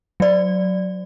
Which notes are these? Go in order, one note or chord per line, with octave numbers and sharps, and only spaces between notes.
F#3 D5